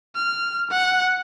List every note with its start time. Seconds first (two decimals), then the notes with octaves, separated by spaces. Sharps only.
0.16 F6
0.71 F#5